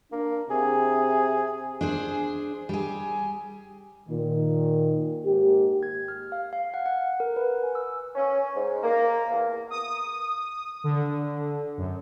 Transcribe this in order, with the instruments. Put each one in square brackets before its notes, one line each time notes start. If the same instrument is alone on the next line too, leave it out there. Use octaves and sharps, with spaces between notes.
[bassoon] A#3 [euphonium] D4
[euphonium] C3 [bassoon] G#4
[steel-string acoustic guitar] D4 G#4 C5
G3 G#4
[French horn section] A#2 D#3
G#2 A#3 G4
[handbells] G#6
F6
F5
F5
F#5
F#5
A#4
B4
G#5
E6
[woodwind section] C#4
G#2
A#3
E2
[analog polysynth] D#6
D3
F#2